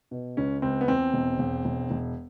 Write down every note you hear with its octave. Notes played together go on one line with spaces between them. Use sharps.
B2
C#2 C#4
C#2 C4
B3
E2 C4
E1
E1
E1
E1